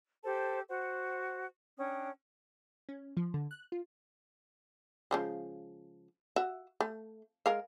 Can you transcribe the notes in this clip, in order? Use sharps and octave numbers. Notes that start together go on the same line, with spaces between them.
G4 A4 C5 A5
F#4 C5 F#5
C#4 D4 G5 D#6
C#4
F3
D3
F#6
F4
C#3 F3 G#3
F#4 E5
A3
G#3 A#4 F5